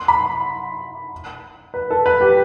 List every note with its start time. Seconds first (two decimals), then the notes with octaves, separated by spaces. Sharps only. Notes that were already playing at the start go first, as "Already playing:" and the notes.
Already playing: C6
0.08 B5
1.74 B4
1.91 A4
2.06 B4
2.21 G4